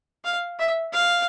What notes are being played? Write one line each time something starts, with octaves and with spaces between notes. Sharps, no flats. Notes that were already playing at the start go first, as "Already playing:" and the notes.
F5
E5
F5